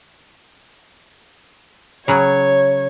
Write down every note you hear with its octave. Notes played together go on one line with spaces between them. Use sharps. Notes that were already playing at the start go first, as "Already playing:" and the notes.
C#3 F#3 C#5